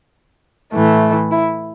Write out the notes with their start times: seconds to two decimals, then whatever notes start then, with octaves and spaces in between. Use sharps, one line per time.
0.72 A2 E3 A3
1.31 E4